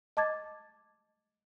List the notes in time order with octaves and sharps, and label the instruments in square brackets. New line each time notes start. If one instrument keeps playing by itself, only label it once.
[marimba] D#5 A5 D6 G#6 A6